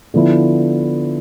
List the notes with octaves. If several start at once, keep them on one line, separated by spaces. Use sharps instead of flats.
D3 F3 B3 E4